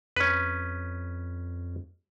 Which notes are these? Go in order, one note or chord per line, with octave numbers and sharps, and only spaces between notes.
F2 C#4 B4